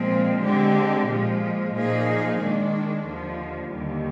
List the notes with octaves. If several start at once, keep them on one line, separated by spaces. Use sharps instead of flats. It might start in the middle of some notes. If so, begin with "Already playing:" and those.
Already playing: A#2 F3 G#3 C4
D3 G#3 C4 G4
A#2 F3 G#3
A#2 F3 A#3 D#4 G#4
D#3 G#3 D4
D#2 D3 F3
D#2 D3 G3